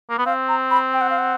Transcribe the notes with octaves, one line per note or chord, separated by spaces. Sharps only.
A#3
B3
C4 F5
A#5
B5
G5
F#5
F5
F#5